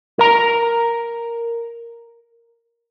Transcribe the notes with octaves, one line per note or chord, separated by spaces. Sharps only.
A#4 A#5